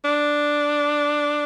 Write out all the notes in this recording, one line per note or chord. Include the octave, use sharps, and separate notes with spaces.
D4